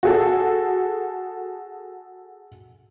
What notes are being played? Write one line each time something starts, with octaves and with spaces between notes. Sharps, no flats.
F#4 G#4 A4